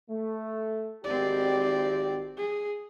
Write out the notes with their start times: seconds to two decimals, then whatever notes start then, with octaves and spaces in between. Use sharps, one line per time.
0.10 A3
1.04 G#1 C4 G4 D5
2.37 G#4